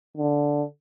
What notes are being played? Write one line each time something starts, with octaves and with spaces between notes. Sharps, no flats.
D3